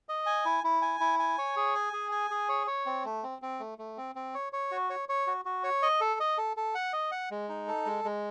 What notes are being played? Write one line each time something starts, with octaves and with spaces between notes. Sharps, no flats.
D#5
G#5
E4
E4
G#5
E4
G#5
C#5
G#4
G#5
G#4
G#5
G#4
C#5
C#5
C4
A3
C4
C4
A3
A3
C4
C4
C#5
C#5
F#4
C#5
C#5
F#4
F#4
C#5
D#5
A4
D#5
A4
A4
F#5
D#5
F#5
G#3
D#4
A4
G#3
G#3